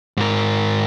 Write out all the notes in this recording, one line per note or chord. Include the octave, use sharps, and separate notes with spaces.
G#2 A#4